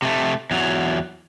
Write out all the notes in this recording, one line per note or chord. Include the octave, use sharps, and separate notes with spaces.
C3 A3
E2 F#3